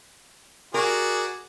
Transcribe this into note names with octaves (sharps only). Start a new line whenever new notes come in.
F#4 G#4 A#4 D5